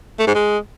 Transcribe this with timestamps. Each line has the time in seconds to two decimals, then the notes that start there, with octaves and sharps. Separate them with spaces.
0.19 A3
0.27 G#2
0.35 G#3